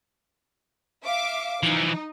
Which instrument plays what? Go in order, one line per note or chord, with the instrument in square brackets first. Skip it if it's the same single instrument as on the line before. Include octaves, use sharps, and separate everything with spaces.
[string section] E5 F5 D6
[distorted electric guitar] E3 F3 [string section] D#4